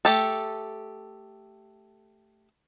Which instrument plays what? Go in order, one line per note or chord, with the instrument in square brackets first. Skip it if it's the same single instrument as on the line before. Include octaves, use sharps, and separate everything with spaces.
[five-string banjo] A3 G4 A4